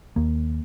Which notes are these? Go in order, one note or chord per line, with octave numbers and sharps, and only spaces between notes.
D#2 A#3